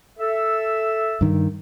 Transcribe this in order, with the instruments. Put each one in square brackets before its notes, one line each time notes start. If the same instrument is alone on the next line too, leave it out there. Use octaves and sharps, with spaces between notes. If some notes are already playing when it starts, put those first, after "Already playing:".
[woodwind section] A4 E5 E6
[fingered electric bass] G2 D#3